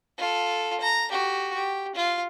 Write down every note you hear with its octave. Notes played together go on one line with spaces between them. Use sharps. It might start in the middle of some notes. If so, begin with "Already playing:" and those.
F4 A4
A#5
F#4 G4
G4
F4